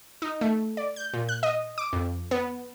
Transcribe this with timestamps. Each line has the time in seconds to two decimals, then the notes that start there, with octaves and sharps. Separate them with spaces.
0.22 D#4
0.41 A3
0.77 D5
0.96 G6
1.14 A#2
1.29 F#6
1.43 D#5
1.78 D6
1.93 F2
2.31 B3